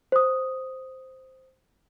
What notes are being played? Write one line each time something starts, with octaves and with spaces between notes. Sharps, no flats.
C5 D#6